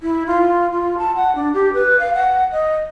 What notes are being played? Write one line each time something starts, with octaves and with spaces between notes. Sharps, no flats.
E4
F4
F4
A5
F#5
D4
G4
B4
F5
F#5
D#5